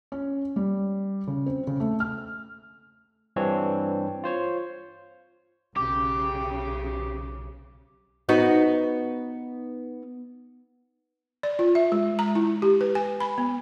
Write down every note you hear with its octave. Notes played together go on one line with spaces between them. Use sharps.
C#4
G3
C#3
C4
C#3
A3
F6
G2 E3 C4 D4 C#5
F4 C5 C#5
B1 C#3 G4 D6
B3 D#4 F#4
D5
F4
E5
G#3
A#5
E4
G4
B4
G#5
B5
B3